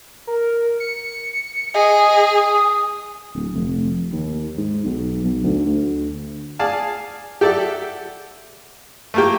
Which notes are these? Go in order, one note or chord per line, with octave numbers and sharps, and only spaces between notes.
A#4
C#7
G#4 D#5
D#6
D1
F1
D#2
G#2
B1
B1
D2
D2
G#4 D5 F5 G#5 A5
G4 A4 D5 E5 F#5
A3 A#3 G4